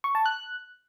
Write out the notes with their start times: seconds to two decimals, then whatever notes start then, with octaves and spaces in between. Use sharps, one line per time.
0.04 C#6
0.15 A5
0.26 F#6